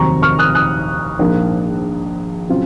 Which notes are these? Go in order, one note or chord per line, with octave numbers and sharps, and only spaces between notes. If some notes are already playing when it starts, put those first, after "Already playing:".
Already playing: F1 D#2 D#3 F#3 C4 A#5 C#6
C#6 F6
D#6 F#6
D#6 F#6
A#1 G#2 F3 A#3 F4
C#3 F#3 C4 F4